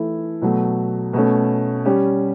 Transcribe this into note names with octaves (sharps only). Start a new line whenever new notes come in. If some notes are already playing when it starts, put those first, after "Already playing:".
Already playing: E3 A3 E4 A4
B2 F#3 A3
B2 A3 C#4
G3 C#4 G4